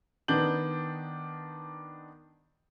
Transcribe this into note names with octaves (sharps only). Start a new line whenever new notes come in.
D#3 B3 D4 G6 F#7